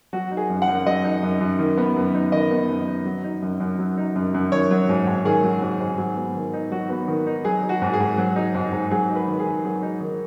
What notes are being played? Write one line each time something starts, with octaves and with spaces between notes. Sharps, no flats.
F#3 F#4
D#4
G#4
F#2
F#5
F#2
F#3 D#5
D#4
F#2
F#2
D#3
B3
F#2
D#4
D#3 D#5
B3
F#2
D#4
F#3
D#4
F#2
F#2
F#3
D#4
F#2
F#2
D#3 C#5
F#3
G#2
G#2
D#3 G#4
F#3
G#2
G#2
F#3
B3
D#3
D#4
F#3 F#4
B3
D#3
D#4
F#3 G#4
D#4
F#4
G#2
G#4
G#2
F#3
D#4
G#2
G#2
F#3 G#4
D#4
B4
D#3
G#4
D#3
F#3 G#4
D#4
D#3